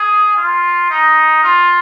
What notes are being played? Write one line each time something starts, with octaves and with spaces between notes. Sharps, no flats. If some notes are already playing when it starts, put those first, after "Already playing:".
Already playing: G#4
F4
D#4
F4